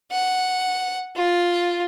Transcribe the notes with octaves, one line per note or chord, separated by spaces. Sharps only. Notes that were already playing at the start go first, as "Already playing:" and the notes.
F#5
F4